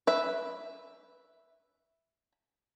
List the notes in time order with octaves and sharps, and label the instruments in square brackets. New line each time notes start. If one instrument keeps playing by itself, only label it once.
[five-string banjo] B4 E5